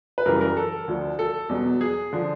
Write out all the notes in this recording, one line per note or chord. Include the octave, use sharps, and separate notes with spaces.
B4
F#2 C#3 E3 G3 A#4
A#4
A4
D2 D3 F3
A4
E2 B2 F#3
G#4
D3 F3